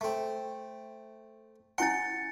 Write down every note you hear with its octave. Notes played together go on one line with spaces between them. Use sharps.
A3 C4
C#4 E4 F#5 G#5 C6 A6 C#7